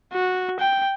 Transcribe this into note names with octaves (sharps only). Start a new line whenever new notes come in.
F#4
G5